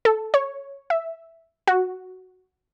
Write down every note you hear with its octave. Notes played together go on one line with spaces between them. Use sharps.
A4
C#5
E5
F#4